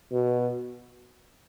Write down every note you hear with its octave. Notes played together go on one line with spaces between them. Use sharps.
B2